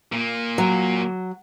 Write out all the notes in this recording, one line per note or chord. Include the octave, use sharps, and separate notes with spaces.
A#2 A#3
F#3